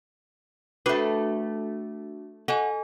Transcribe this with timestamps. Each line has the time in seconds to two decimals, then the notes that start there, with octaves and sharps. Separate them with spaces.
0.86 A3 D4 F#4 B4 D6
2.48 F#4 A4 D#5 G#5